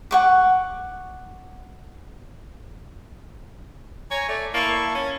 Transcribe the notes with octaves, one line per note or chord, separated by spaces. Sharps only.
F#5 C#6 D6
C#5 G#5 A#5
A3 D5
A#3 E4 A5 C#6
A#3
C#4